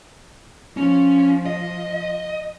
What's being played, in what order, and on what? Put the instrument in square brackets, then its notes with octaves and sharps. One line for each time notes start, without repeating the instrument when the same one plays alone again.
[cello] F3 [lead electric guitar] C#4
[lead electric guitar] D#5